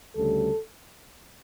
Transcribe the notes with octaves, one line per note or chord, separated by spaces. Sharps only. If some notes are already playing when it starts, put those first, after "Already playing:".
D2 C#3 G3 A4